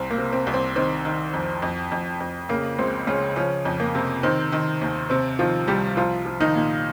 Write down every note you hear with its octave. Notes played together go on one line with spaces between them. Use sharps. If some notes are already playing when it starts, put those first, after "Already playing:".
Already playing: C2 C4
A#3
C3
C4
C2
C4
D#3 C4
D#3
F2
F2
F2
F2
C#3 A#3
C#2 C4
C#2 C#3 C#4
C#3 F3 C#4
F2
A#3
C3
D#3 C4
D#3
D#2
C3 C4
D#3 F3 F4
C2 G3 G4
C2 F3 F4
F3
D#3 D#4
A#2